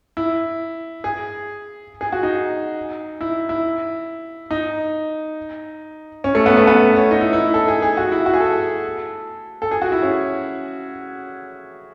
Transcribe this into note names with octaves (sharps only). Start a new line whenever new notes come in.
E4
G#4
G#4
F#4
D#4
E4
E4
D#4
C#4
A3
B3
A3
B3
C#4
D#4
E4
E4
A4
G#4
G#4
F#4
E4
F#4
G#4
A4
A4
G#4
F#4
E4
C#4